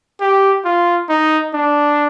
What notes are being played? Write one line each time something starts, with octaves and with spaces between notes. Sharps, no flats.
G4
F4
D#4
D4